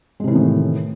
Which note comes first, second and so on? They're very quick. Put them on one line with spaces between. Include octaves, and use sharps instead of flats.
G#3 C3 E3 D#3 A2